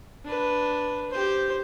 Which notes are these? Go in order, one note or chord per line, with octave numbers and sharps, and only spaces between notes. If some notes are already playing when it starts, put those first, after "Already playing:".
D4 B4
G4 C5